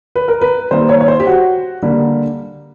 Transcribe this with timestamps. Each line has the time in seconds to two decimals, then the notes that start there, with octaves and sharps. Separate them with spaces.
0.16 B4
0.28 A#4
0.41 B4
0.71 D#3 G3 A#3 C5
0.89 C#5
1.01 C#5
1.08 C5
1.20 G4
1.27 F#4
1.82 D3 G3 A#3